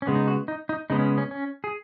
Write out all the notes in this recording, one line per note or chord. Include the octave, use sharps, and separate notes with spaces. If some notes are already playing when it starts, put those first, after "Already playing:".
C#4
C#3 G#3 B3
D#4
F#4
D#4
D#4
C#3 G#3 B3 D#4
C#4
C#4
C#4
G#4